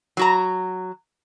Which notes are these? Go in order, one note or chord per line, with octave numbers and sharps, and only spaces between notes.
F#3 F#4 A#5